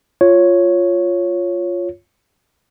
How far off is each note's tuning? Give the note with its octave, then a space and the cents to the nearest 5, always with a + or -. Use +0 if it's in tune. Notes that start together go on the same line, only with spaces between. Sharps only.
F4 +0 C#5 +0